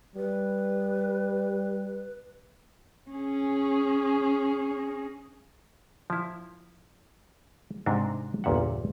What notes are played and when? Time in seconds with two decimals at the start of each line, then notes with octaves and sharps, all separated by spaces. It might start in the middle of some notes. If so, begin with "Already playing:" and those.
0.16 G3 B4
3.11 C#4 G#4
6.10 F3 E4
7.86 G#2 C3 D4 F#4
8.44 G1 E2 A#2 E5 F#5